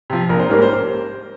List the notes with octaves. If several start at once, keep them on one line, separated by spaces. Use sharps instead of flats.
C3 F3
A#1 A#4
C5
G#2 G3 A#3 C#4 A#4
C5